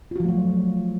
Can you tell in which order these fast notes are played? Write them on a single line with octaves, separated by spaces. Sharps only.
F4 F#4 F3 A3 F#3